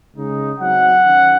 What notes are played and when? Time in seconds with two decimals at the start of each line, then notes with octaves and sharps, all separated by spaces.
0.17 C#3 G#3 D#4
0.60 F#3 C4 D#4 F#5
1.04 D#3 F#3 C#4